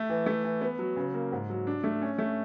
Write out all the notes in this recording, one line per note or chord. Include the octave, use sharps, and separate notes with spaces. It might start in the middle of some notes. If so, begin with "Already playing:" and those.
Already playing: A3
E3
A3
E3
B3
F#3
C#3
A#3
G#2
F#3
D4
A3
C#4
A3